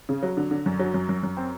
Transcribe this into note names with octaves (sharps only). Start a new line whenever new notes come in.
C#3
F#3
D3
D3
F#2
F#3
F#2
F#2
F#2
C4